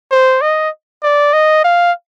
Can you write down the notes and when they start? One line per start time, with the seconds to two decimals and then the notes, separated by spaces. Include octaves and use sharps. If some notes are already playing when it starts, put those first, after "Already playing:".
0.11 C5
0.42 D#5
1.03 D5
1.33 D#5
1.64 F5